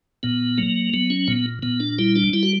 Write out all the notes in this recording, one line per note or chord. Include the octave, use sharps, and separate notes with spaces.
A#2 B3
F#3 A#3
F#3 B3
C#4
A#2 B3
A#2 B3
D4
G3 E4
D4
G3 E4
F#4